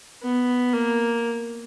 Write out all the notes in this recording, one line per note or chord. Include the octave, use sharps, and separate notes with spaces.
B3
A#3